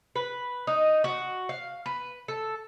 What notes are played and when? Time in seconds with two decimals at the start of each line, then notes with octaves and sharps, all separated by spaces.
0.16 B4
0.67 D#4
1.04 F#4
1.49 F5
1.86 B4
2.28 A4